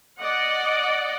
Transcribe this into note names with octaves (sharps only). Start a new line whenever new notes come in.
D5 D#5 F#5